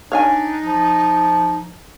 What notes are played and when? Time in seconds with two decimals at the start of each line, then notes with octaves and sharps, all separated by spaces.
0.12 D4 D#4 C#5 F5 G#5
0.64 F3